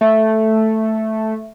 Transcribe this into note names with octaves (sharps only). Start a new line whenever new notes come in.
A3 E5